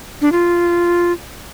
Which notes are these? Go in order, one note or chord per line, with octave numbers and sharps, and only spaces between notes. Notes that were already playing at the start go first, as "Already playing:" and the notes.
D4
F4